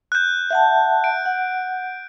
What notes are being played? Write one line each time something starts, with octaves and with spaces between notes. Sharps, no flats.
F#6 G6
E5 F#5 A5
D7
F#5